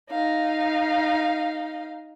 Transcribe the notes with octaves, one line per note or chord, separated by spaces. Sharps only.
D#4 F5